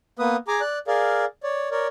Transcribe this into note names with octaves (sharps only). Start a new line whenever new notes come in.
A#3 B3 B4 D#6
G#4 G#5 A#5 D6
D5 F#6
G#4 A#4 D5 F5
C#5 D5
A#4 C#5 D5